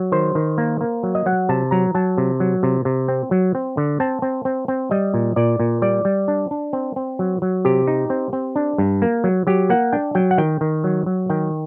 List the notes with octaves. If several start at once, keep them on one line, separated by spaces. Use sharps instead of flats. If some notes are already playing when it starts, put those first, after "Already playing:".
Already playing: F#3
D#3 C5
D#3
A#3
A#3
F#3
D#5
F#3 F#5
C3 A5
F#3 A#5
F#3 A5
C3
F#3
C3
C3
C4
F#3
C4
D3
C4 A5
C4
C4
C4
G3 D#5
A#2
A#2 D5
A#2
G3 D5
G3
D4
D4
C4
C4
F#3
F#3
C3 G4
D#4
C4
C4
D4
G2
A#3
F#3
F#3 G4
A#3 F#5
D4 G5
F#3 G5
F#5
D#3 G5
D#3
F#3
F#3
D#3 G5